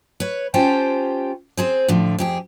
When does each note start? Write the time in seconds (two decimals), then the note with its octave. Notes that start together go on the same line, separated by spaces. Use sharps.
0.20 B4 C#5
0.54 C#4 F4 G4 C5 G5 A5
1.57 C4 G#4 C5
1.88 A2 D3 F3
2.18 F2 G4 G#4